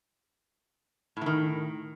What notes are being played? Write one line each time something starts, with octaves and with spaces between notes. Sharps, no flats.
A2 D#3 E3